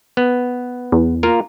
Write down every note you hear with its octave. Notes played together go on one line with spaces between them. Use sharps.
B3
E2
A#3 F4 A#4